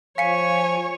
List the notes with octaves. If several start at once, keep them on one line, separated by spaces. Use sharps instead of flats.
F3 C#5 F5 G#5 C#7